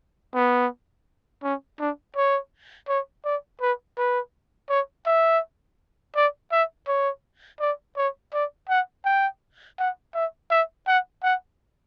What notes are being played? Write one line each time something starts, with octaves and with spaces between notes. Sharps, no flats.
B3
C#4
D4
C#5
C#5
D5
B4
B4
C#5
E5
D5
E5
C#5
D5
C#5
D5
F#5
G5
F#5
E5
E5
F#5
F#5